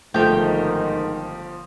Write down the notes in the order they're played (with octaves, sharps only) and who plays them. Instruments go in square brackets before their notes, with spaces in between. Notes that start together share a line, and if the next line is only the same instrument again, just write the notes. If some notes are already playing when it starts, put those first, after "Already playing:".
[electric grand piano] G1 F3 [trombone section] G#2 D#3 [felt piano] A3 [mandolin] G4 G5